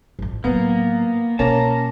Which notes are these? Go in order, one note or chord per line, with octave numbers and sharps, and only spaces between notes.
A1 F2
A2 F#3 A#3 B3
B2 A#3 C#4 A5 A#5